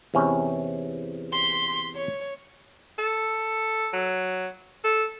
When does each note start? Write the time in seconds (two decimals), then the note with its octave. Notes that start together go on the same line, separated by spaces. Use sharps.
0.14 E2 C3 C#4
1.32 C6 B6
1.95 C#5
2.99 A4
3.93 F#3
4.84 A4